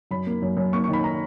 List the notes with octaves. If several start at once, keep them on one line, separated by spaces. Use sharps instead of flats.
F#2 B5
A#3
F#2
F#2
A#3 C#6
C#6
D#3
B5
A#5